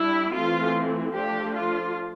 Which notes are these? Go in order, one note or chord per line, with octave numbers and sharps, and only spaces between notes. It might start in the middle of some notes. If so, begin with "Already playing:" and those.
Already playing: G3 D4 E4
E3 A3 C4 F4
F3 A3 D4 G4
F4